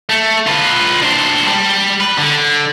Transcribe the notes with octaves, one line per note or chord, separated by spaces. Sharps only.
A3
F4 B4
D4 C5
G3
B4
D3